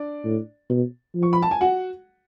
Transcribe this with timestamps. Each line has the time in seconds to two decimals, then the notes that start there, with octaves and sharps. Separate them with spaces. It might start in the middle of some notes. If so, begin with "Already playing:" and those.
Already playing: D4 D5
0.25 A2
0.70 B2
1.15 F3
1.23 C#6
1.33 B5
1.42 A5
1.51 G#5
1.61 F#4 F#5